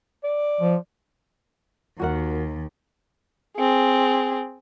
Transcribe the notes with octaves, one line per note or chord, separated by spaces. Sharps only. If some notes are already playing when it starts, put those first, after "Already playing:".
D5
F3
D#2 F#4 A#4 F#5
C4 G#4